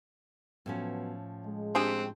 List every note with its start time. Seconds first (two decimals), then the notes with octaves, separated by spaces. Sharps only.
0.66 A2 F3 F#3 B3 C#4
1.44 G#3
1.75 C4 D4 G4 G#4